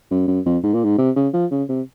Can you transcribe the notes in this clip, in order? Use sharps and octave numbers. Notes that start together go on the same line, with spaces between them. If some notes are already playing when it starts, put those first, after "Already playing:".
F#2
F#2
F2
G#2
A#2
G#2
C3
C#3
F3
C#3
C3